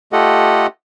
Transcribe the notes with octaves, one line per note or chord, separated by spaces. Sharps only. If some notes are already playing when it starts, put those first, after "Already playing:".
A3 F4 G4 A4 D#5 F#5